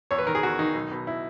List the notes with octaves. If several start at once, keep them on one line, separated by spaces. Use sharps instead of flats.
E2 C#5
B4
D#3 A#4
G#4
E2 F#4
D#3 D#4
B1
B2
E4